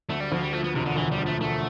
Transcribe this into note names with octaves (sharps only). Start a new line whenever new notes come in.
D2 A3
G3
D2 F3
G3
F3 A3
B3
E1 C3
D3
D2 E3
G3
F3
A3
E1 A3